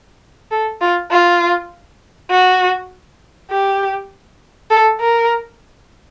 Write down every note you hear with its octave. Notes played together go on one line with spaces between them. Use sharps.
A4
F4
F4
F#4
G4
A4
A#4